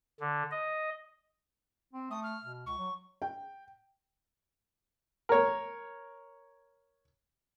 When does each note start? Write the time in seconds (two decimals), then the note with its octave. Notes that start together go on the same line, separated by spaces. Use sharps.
0.20 D3
0.51 D#5
1.93 C4
2.11 A3 D#6
2.23 F6
2.44 B2
2.66 C#2 C#6
2.79 F#3
3.22 G5
5.29 A#4 C#5